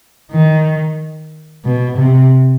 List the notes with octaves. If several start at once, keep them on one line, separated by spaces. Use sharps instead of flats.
D#3
B2
C3